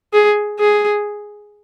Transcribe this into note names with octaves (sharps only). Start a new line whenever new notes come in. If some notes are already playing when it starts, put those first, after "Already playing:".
G#4
G#4